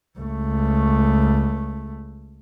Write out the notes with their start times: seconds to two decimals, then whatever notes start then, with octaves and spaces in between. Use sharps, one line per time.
0.19 C#2 A3